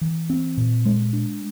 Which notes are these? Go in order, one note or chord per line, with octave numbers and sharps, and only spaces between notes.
E3
C4
A#2
G#3
D4